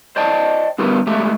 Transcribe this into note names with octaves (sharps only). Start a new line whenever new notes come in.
C5 D5 D#5 G5 A5
D3 G3 B3 G4 A#4 B4
G#3 A3 G4 A4 E5